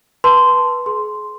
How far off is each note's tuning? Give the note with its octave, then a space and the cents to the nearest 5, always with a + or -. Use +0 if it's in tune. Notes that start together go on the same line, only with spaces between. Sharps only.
B4 -15 A5 +0 C6 -10
G#4 +35 C6 +0